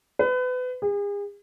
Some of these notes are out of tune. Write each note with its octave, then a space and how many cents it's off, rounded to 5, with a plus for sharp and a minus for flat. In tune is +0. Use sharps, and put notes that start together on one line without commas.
B4 +30
G#4 -40